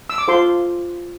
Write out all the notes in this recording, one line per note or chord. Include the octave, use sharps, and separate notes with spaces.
E6
D6
F4 A4 C5 C6